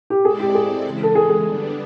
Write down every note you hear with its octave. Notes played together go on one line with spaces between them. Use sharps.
G4
G#3 C4 E4 G#4 A4 D5
G4
G#4
C#3 E3 G#3
A4
G#4
G#4
D3 G3 B3 D4